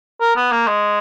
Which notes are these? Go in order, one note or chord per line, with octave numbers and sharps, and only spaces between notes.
A#4
B3
A#3
G#3